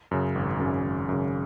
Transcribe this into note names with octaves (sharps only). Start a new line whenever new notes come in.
F#2 C#3
G#1
F#2 C#3
G#1
F#2 C#3